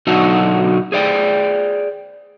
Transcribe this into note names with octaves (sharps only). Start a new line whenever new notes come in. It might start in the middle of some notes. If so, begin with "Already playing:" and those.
B2 D3 F#3 D#4 F#4 A4
G#4 C5 D5 G5